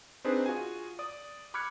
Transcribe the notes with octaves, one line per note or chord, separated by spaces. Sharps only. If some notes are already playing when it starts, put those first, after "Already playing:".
C4 D4 D#4 G#4 B4 C5
F4 F#4 G#4 G#5
D5 D#6
B5 D6 F6 F#6 G#6 C#7